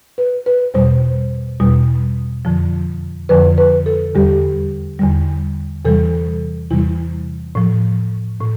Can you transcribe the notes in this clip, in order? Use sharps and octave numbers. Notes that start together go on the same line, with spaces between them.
B4
B4
E2 B2 G3 C5
E2 B2 G3
F2 D3 F3
F2 D3 F3 B4
B4
A4
E2 D3 G3 G4
E2 D3 G3
E2 C3 E3 G3 A4
E2 C3 E3 G3 E4
A2 F3
A2